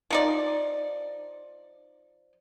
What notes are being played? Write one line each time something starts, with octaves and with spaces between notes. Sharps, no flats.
F3 D#4 D5